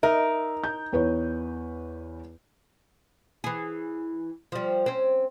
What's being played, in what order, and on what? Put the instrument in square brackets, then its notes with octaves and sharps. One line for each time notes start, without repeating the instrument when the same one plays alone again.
[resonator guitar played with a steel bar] D#4 A#4 [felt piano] E5
[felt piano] G6
E2 B4 C#5
[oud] E3 G#4
F3 G3
C4 C#4